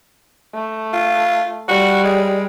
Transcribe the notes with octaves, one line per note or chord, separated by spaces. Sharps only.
A3
F4
G3 F#4
G#3